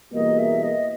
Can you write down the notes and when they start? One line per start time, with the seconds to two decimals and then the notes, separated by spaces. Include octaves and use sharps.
0.13 E2 B2 G3 A#3 D#5
0.38 E5
0.63 D#5